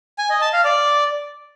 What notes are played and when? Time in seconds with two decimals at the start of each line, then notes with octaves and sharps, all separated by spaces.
0.18 G#5
0.30 D#5
0.41 A5
0.53 F5
0.64 D5